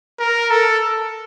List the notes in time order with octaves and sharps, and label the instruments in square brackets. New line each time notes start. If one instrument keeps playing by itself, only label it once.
[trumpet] A#4
A4